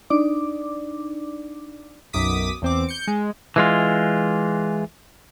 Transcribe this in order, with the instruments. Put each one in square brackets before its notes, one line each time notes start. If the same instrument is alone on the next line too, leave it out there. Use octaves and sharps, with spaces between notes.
[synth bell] D4 D#4 D5 D6
[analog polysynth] B1 F#2 D6 D#6 B6
E2 C4 D6
G6 C#7
G#3
[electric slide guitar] E3 G#3 F4